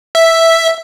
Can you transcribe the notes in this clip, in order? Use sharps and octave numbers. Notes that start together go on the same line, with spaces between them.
E5